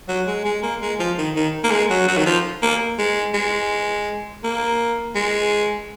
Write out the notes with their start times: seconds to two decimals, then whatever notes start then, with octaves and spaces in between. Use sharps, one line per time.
0.08 F#3
0.27 G#3
0.45 G#3
0.63 A#3
0.82 G#3
0.99 F3
1.18 D#3
1.36 D#3
1.64 A#3
1.71 G#3
1.90 F#3
2.08 F#3
2.17 D#3
2.26 F3
2.62 A#3
2.99 G#3
3.34 G#3
4.44 A#3
5.15 G#3